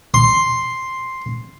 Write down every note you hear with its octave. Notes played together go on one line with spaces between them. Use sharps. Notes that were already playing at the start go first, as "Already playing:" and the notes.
C6